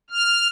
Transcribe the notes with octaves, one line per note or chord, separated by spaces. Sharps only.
F6